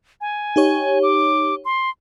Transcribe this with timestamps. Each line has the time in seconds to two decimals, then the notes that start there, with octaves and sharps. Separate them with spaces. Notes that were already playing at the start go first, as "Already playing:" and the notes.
0.21 G#5
0.56 D#4 G4 C#5
1.03 D6
1.65 C6